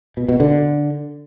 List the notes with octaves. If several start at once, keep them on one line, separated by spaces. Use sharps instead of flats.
B2
B2
D3